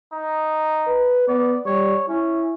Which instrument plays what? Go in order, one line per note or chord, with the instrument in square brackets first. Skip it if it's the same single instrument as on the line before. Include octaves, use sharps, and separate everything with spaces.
[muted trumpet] D#4
[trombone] B4
[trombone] B3 [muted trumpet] D5
[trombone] G3 [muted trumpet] C#5
[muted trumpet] C#4 [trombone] E4